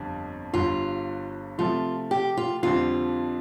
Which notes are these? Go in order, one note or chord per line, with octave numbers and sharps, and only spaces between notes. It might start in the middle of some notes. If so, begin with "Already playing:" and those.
Already playing: G1 F2 D3 G3
G1 G2 D3 F4
C3 F3 A3 F4
G4
F4
F2 D3 G3 C4 F4